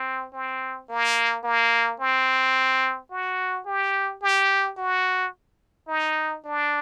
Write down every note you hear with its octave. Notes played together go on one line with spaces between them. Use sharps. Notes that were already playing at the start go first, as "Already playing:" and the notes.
Already playing: C4
C4
A#3
A#3
C4
F#4
G4
G4
F#4
D#4
D4